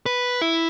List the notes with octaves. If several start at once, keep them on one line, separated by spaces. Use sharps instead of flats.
B4
E4